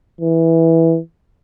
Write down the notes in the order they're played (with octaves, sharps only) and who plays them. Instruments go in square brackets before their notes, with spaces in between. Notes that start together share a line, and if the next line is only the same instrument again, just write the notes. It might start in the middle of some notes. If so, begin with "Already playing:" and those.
[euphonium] E3